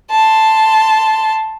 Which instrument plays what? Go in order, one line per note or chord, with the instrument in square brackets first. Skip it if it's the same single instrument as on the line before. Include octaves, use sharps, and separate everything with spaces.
[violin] A5 C6